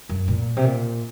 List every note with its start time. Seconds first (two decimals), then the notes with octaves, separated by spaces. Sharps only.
0.09 F#2
0.28 A#2
0.57 C3
0.65 A#2